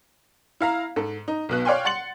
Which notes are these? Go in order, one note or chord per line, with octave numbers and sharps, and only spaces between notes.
E4 F5 A#5
G#2 A4
D#4
B1 B2 F#6
C#5 D5 F5 G5 G#5 C6
F#5 C6 A6 C#7 F#7